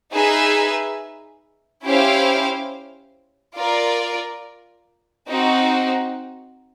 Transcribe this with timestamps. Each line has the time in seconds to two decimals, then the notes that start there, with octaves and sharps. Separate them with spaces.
0.12 D#4 G#4 B4 E5
1.84 C#4 E4 G4 C5 F5
3.57 F4 A#4 D5
5.28 C4 D#4 F#4